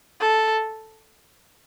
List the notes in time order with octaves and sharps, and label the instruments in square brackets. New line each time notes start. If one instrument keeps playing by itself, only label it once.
[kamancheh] A4